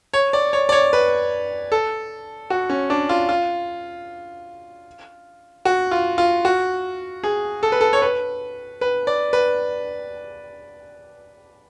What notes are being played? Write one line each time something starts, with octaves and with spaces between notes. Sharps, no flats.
C#5
D5
C#5
D5
C#5
B4
A4
F#4
C#4
D4
F4
F4
F#4
F4
F4
F#4
G#4
A4
B4
A4
C#5
B4
B4
D5
B4